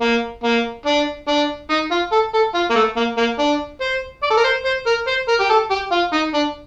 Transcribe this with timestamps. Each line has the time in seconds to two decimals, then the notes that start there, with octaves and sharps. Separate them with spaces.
0.01 A#3
0.44 A#3
0.86 D4
1.28 D4
1.70 D#4
1.91 F4
2.12 A4
2.34 A4
2.54 F4
2.71 A#3
2.76 A3
2.97 A#3
3.18 A#3
3.39 D4
3.81 C5
4.23 D5
4.30 A4
4.37 A#4
4.45 C5
4.65 C5
4.87 A#4
5.08 C5
5.29 A#4
5.40 G4
5.50 A4
5.71 G4
5.92 F4
6.13 D#4
6.34 D4